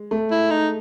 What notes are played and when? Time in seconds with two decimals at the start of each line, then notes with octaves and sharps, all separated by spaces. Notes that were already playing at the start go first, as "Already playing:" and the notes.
Already playing: G#3
0.11 A3
0.31 E4
0.50 D#4